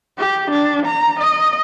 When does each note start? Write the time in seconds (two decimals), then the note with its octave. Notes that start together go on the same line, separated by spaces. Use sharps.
0.18 G4
0.50 D4
0.86 A#5
1.19 D#5